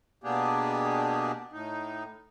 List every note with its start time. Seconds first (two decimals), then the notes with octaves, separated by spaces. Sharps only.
0.24 B2 A#3 B3 D4 G4 G#4
1.53 A2 D#4